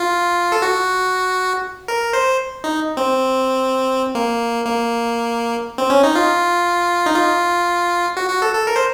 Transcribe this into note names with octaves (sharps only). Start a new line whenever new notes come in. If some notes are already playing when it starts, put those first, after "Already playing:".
Already playing: F4
A4
F#4
A#4
C5
D#4
C4
A#3
A#3
C4
C#4
D#4
F4
D#4
F4
F#4
F#4
A4
A4
A#4
C5